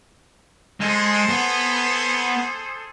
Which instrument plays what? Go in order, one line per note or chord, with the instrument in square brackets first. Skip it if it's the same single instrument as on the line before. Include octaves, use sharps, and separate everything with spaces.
[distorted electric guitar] G#3 [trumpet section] G#4 A4 C5
[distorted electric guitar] B3